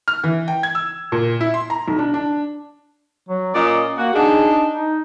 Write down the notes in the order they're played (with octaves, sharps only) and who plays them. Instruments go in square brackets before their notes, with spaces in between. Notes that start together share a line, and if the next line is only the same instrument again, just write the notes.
[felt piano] F6
E3
G5
G#6
E6
A#2
E4
C6
A#5
B1
D4
D4
[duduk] F#3
[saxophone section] A#2 D5 D#5 [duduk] C#4
[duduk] A#3 [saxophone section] F#4
[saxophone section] D4 D#4 [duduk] G#4
[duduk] D#4